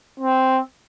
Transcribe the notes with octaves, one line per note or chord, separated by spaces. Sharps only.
C4